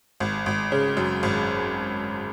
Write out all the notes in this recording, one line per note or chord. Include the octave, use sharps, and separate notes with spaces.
G#1
G#1
C#3
F#2
G#1